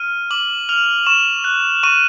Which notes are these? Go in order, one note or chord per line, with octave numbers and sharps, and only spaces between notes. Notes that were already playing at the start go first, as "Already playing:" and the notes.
Already playing: F6 D#7
D6 F#7
F6 F7
C#6 E7
F#6
C#6 D#7